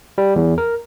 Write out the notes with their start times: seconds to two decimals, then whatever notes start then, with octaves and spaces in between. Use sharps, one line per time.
0.18 G3
0.36 E2
0.58 A#4